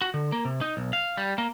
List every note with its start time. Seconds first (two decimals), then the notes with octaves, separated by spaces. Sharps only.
0.02 F#4
0.14 D3
0.32 A#3
0.45 C3
0.61 D#4
0.77 B1
0.93 F5
1.17 G3
1.38 A#3